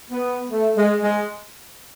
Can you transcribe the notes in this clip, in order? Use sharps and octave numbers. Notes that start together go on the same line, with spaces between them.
B3
A3
G#3
G#3